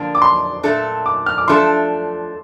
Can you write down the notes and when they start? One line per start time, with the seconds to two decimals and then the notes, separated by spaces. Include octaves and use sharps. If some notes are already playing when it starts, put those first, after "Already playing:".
Already playing: D3 F3 A#3 D4
0.15 D6
0.22 C6
0.63 A#2 A3 D4 A4
1.06 D6
1.26 F6
1.38 D6
1.48 F3 A3 D4 A4 C6